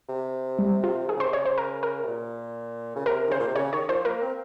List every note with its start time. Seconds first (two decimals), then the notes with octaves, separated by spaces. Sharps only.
0.09 C3
0.59 G3
0.84 F4
1.08 D#3 G#4
1.17 C#3
1.20 C5
1.24 C3
1.33 C#3 C#5
1.46 C5
1.58 A#4
1.83 A#4
2.03 C3
2.07 A#2
2.96 C#3
3.06 C3 A#4
3.27 D#3
3.31 C#3 C5
3.40 A#2
3.48 C3
3.55 C#3 C#5
3.73 D#3 C#5
3.89 F3 C5
4.05 A#3 A#4
4.22 C4